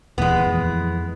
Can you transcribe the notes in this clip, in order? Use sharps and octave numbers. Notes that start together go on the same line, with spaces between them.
D#1 A#2 E3 G#3 B3
F2 E3